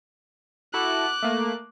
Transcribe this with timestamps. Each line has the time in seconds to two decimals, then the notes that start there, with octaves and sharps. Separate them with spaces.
0.74 E4 F#4 A4 D6 F#6
1.23 A3 A#3